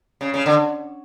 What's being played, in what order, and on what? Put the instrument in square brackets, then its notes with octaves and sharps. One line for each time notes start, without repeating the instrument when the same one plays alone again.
[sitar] C#3
C#3
D3